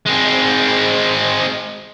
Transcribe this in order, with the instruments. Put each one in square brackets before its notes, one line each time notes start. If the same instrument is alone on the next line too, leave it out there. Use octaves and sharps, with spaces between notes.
[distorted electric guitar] G#3 C4